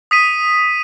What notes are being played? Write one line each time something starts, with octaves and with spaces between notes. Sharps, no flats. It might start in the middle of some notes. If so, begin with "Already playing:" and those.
D#6 B6 D#7